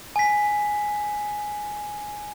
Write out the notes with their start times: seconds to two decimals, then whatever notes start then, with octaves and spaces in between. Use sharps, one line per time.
0.16 G#5 B6